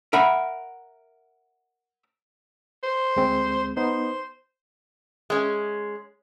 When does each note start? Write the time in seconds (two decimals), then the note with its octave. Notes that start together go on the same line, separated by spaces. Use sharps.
0.13 A#4 E5 F#5 B5
2.83 C5
3.16 D2 G#3 C4
3.77 B3 D#4 C5
5.30 G#3 C#4